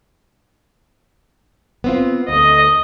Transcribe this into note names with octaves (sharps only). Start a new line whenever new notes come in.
B3 C4 F4
D2 A3 D#5